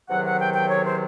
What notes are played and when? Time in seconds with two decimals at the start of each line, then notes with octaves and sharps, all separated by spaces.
0.09 E2 C3 D#3 F#3 F#5
0.25 F#5
0.40 G5
0.54 G5
0.69 C#5
0.86 C5